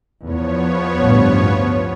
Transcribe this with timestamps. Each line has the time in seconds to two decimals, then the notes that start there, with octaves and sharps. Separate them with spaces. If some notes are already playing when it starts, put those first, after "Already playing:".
0.24 E2 F3 B3 C#5
1.01 A1 D2 G2